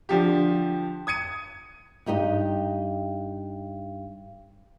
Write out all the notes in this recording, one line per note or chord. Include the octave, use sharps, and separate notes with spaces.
D3 F3 G4
D#6 G#6 C#7 D#7
G2 D#4 G4 D#5